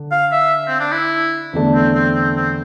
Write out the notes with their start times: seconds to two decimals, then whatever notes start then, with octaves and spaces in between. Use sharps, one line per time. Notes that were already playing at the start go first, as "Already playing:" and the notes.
Already playing: D3
0.12 F5
0.32 E5
0.68 C4
0.80 D4
0.92 E4
1.53 E2 D3 A3 D4
1.75 C4
1.95 C4
2.15 C4
2.36 C4